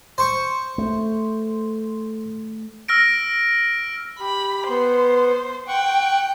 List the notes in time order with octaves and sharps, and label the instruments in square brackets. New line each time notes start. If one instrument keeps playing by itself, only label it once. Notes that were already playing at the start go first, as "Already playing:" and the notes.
[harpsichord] C5 C#6
[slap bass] A3
[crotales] E6 F6 A#6 D7
[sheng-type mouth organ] G4 [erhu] B5
[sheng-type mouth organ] B3 [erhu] C5
[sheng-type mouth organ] F#5 C#6 [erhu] G5